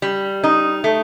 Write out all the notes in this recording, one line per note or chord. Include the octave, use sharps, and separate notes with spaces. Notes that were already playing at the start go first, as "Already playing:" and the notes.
G3
D#4
A3